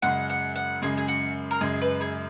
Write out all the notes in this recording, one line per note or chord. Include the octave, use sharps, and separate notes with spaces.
F#2 C#3 G#3 F#5
F#5
F#5
F#2 C#3 G#3 G#4
G#4
F#4
A#4
F#2 C#3 G#3 G#4
B4
G#4